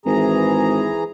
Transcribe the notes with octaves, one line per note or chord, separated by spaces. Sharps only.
G#1 E3 G#4 A#5